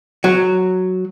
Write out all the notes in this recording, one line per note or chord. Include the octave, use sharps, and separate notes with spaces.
F#3